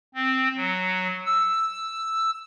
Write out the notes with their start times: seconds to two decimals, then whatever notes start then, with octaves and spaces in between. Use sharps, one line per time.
0.14 C4
0.57 F#3
1.26 E6